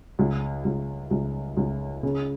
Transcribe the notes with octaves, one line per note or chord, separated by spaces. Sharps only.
C#2
C#2
C#2
C#2
C#3